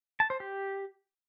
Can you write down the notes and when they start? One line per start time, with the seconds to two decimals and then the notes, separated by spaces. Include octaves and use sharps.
0.20 A5
0.30 C5
0.40 G4